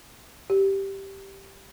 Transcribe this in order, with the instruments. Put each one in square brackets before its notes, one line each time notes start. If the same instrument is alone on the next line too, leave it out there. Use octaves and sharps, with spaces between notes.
[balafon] G4